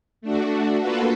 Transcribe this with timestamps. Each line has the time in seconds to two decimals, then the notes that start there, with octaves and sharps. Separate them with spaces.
0.21 A3 D4 F#4
0.81 A#3 F4 F#4 A4 B4